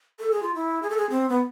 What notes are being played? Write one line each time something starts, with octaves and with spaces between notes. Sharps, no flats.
A4
G#4
F4
E4
G#4
A4
G#4
C4
B3